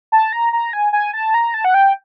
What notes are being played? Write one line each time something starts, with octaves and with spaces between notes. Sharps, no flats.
A5
A#5
A#5
G#5
G#5
A5
A#5
A5
F#5
G5